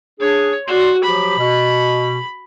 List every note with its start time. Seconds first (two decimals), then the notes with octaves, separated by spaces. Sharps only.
0.20 D4 G#4 C#5
0.67 F#4 D5 C6
1.04 F3 F#3 G4 B5
1.39 B2